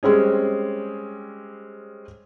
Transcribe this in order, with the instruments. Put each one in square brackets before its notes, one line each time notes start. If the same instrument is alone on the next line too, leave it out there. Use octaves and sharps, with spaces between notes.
[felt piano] G3 G#3 C4 C#4 G#4